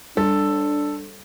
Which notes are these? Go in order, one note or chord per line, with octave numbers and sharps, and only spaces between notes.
G3 D4 A4